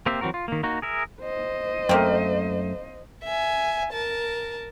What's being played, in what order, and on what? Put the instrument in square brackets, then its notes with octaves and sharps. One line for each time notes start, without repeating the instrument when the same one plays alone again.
[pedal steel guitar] A#3 C4 G4 C5 E5
E3 F#3 C4 F#4 A#4
F4
D#3 A#3
A#3 D#4 F#4
G#4 A#4 E5
[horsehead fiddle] C5 D#5
[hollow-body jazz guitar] F#2 A3 [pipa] A#3 C4
[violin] E5 G#5
A#4 A5